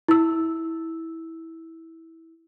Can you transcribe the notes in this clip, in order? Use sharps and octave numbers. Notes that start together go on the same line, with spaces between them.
E4 E6